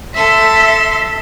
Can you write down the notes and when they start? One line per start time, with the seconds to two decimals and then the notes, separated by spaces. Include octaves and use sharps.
0.15 A4 E5 C6